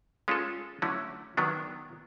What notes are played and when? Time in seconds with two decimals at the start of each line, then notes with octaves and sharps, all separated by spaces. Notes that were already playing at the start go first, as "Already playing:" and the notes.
0.28 G#3 C#4 F4 A4
0.82 D3 F#3 A3 C#4 E4
1.37 D#3 F#3 B3 D4